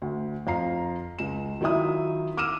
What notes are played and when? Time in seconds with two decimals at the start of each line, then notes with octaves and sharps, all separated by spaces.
0.02 D2
0.47 F2 F5 A#5 C7
1.19 C#2 E7
1.61 D#3 F#3 E4 F4 E5 D#6
2.37 D6 E6 F6 D#7 E7